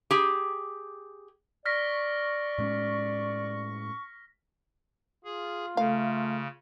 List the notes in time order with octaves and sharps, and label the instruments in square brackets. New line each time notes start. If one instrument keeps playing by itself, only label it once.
[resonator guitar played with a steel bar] G4 G#4
[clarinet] D5 [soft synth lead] C#6 [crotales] F6 A#6 B6
[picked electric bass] A2 G#3 C#4
[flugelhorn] F4 [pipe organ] G#4
[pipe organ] C#3 [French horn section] A3 [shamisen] F5